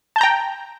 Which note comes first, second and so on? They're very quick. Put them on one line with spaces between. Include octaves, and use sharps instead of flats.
A5 G6 A#5 G5